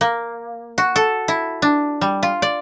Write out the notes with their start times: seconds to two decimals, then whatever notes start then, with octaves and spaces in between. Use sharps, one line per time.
0.01 A#3
0.78 F#4
0.96 A4
1.28 E4
1.62 D4
2.01 G3
2.23 F4
2.42 D5